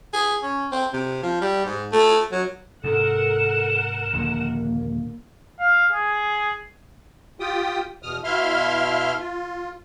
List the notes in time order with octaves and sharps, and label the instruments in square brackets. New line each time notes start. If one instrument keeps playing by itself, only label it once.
[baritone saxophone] G#4
C#4
C4
C3
F3
G3
G#2
A3
F#3
[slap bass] G#2 C3 [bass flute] A4 [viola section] A#4 F#5 [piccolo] E7
[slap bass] D#1 A#1 D3 [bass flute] A#3
[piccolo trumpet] F5
G#4
[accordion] F4 G4 G5 D#6
E2 B2 D#6 F6
B2 E4 E5 F5 C6 F6
F4